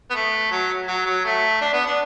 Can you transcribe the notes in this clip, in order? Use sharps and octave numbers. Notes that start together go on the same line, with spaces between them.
B3
A3
F#3
F#3
F#3
A3
D4
B3
D4